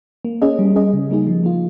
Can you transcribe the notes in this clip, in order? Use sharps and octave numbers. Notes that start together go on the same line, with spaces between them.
A#3
C#4 G#4 D#5
G3
C#4 G#4 D#5
C#3
G3 A#3 D#4 G#4
F3
A#3 F4